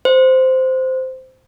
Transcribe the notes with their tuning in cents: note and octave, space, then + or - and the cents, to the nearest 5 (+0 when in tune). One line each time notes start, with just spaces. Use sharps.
C5 -10